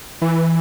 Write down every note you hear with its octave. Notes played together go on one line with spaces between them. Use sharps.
E3